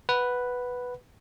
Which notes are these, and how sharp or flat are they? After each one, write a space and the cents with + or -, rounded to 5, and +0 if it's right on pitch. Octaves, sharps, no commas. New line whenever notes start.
B4 +0 F#5 +0